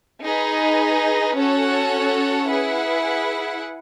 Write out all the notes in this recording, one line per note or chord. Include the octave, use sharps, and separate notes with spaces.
D#4 G#4 B4
C#4 F#4 A4 C#5 F#5
E4 G#4 B4 F#5